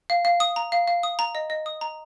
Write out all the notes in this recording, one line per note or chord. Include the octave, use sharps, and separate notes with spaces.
F5
F5
D#6
A#5
F5
F5
D#6
A#5
D#5
D#5
D#6
A#5